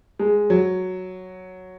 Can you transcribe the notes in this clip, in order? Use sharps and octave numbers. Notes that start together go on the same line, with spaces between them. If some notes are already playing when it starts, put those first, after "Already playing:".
G#3
F#3